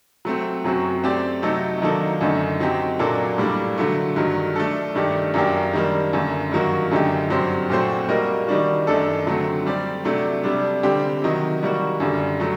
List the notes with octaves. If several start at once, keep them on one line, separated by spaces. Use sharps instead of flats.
F#3 A3 C4
F#2 F#3 C4 F#4
A3 C4 G4 D5
C3 F#3 A3 D#4 A4
D#3 F#3 A#3 D4 A4
F#2 D3 A3 D#4
F#3 C4 D#4 G4
A#2 F#3 A#3 D4 A4
A2 G3 A#3 D4
D3 F#3 A3
G2 D#3 F#3
A3 D4 A4
G2 D#3 A3 D4 G4
F#2 F#3 A#3 D4 G4
D#3 G3 A#3 D4
F#2 D3 A3
G2 D#3 F#3 A#3 F#4
F#2 D3 A3 D#4 G4
G2 F#3 C4 G4 C5
A#2 A3 C4 F#4 C5
G3 A#3 F#4 A#4 D#5
D#3 G3 D4 F#4
F#2 D#3 A3 D4 A4
D3 F#3 A3 C4
G3 C4 G4 D5
C3 F#3 A3 D4
C3 G3 D4
D3 G3 C4 G4
C3 D#3 F#3
D#3 G3 A#3 F#4
F#2 D3 G3
F#3 A3